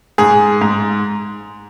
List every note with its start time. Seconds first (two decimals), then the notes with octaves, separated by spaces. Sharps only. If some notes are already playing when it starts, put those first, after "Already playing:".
0.18 G#2 G#4
0.61 G#2